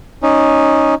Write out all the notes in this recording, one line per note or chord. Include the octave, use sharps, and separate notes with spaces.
C#4 D#4